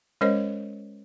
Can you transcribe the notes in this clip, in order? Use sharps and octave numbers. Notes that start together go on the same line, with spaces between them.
G#3 C#4 A#4 C5 C#5 D#5